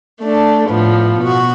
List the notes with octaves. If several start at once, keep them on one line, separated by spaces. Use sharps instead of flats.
A3 D4
A2 F3 B3
B2 F#4